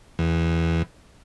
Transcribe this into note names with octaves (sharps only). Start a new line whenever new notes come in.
E2